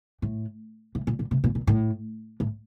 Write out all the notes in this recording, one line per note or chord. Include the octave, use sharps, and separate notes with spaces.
A2
A2
A#2
A#2
C3
A#2
A#2
A2
A2